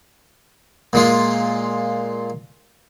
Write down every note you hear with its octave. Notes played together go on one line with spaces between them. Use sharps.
A#2 G#3 F4